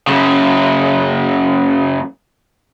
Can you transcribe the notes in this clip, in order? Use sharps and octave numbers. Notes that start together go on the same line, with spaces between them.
F#2 C#3